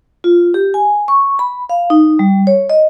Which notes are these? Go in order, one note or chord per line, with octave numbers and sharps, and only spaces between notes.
F4
G4
G#5
C#6
B5
F5
D#4
G3
C#5
D#5